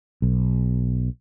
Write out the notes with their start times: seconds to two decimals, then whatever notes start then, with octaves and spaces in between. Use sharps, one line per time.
0.22 B1